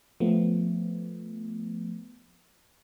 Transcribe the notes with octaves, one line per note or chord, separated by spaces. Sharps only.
F3 A3 B3